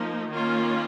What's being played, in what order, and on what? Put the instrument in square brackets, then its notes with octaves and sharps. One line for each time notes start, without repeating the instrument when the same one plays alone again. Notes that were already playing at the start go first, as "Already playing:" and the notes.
Already playing: [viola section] F3 A#3 D#4
D#3 A#3 C#4 F4